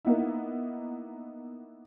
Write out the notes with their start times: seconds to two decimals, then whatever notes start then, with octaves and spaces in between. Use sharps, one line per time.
0.05 A#3 B3 D#4 E4